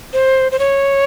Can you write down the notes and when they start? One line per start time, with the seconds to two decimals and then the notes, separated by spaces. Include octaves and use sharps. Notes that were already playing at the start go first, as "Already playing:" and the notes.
0.13 C5
0.52 C5
0.59 C#5